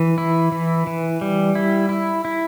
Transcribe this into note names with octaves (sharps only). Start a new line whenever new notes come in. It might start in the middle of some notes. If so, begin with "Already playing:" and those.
Already playing: E3
E4
E3
E3
G3
E4
E4
E4